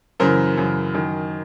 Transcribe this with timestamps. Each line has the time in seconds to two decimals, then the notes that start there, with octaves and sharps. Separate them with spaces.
0.20 F#2 C#3 E3 A#4 C5
0.57 F#2 C#3 E3
0.94 F#2 D#3